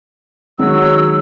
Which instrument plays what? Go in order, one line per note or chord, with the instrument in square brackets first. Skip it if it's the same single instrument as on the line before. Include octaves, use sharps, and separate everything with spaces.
[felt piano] D#3 G#3 C#4 [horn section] F#3 [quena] E6